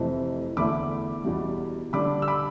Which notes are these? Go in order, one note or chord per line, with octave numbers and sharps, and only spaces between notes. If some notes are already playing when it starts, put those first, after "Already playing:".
Already playing: F2 C3 E3 A3 C4
E2 D3 A3 E4 B5 D6
E2 B2 G3
D3 G3 D4 B5 D6
E6
B5 D6